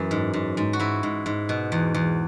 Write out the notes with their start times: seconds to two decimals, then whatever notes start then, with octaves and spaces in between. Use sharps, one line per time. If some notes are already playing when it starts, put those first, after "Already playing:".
Already playing: F#2 E3
0.11 G#2
0.34 G#2
0.57 G#2
0.73 F#4
0.80 G#2 E4
1.03 G#2
1.26 G#2
1.49 B2
1.72 E2
1.94 E2